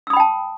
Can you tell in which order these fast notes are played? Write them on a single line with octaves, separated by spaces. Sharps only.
E6 D#6 B5 G5 A5